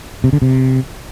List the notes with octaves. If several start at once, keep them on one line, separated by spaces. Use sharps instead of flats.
C3
D3
C3